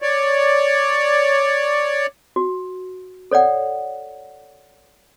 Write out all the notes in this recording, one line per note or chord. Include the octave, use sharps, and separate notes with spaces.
C#5 D5
F#4
A4 C#5 D5 F#5